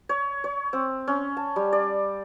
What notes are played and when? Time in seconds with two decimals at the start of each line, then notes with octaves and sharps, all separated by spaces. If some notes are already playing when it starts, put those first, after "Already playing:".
0.09 C#5
0.44 C#5
0.73 C4
1.08 C#4
1.37 A5
1.56 G3
1.73 D5